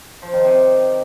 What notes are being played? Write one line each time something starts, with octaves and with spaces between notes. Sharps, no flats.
F3
D#3
C3